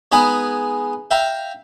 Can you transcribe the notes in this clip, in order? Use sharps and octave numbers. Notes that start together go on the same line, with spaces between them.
G#3 B3 D#4 G#4 B4 G#5
E5 F5 G5 A#5